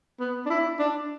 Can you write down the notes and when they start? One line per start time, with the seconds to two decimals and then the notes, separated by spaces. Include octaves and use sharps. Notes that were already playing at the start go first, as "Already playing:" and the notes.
0.20 B3
0.46 D4
0.50 E4
0.79 D4